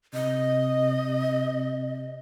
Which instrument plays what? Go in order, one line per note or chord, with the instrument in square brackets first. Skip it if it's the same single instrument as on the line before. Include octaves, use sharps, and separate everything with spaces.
[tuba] C3 [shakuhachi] D#5